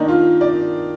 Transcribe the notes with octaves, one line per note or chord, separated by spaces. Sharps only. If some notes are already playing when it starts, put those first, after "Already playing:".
Already playing: D#3 A#3 D4 D#4
F4
D5